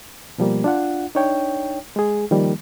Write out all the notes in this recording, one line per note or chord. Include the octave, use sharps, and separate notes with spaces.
B2 F3 G3 A#3
D4 F4 F#5
D4 D#4 C#5 G5
G#3 G#4
D#3 F3 G3 A#3